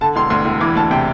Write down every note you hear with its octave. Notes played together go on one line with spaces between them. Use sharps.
D3 A5
E1 C6
D2 C6
E1
E3 D6
D2 A5
C3 G5